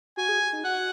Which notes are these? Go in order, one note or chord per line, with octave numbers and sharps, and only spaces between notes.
F#4 G#5
G#4
D#4
F#4 F#5